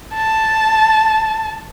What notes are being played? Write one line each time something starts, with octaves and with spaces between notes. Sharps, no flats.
A5